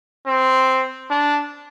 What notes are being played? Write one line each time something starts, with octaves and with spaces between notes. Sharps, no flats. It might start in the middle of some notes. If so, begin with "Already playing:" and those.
C4
D4